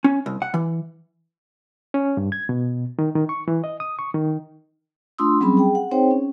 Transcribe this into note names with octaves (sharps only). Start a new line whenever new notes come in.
C#4
C2
F#5
E3
C#4
G2
G#6
B2
D#3
D#3
C#6
E3
D#5
D#6
C#6
D#3
A3 D4 F4 C6 D#6 E6
F#3 G3 C4 C#4 G#4 B5
G#4 G5
F#5
C4 D#4 G#4 C5 C#5 G5
C#4